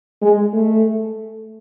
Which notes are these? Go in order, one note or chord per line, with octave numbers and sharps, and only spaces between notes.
G#3
A3